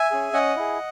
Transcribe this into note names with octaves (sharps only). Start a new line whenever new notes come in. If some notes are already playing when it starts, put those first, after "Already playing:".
Already playing: E5 G#5
C#4 G#4
C#4 D#5 F#5
E4 G#4